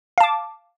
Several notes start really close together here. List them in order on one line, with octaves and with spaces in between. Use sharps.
F5 A5 D6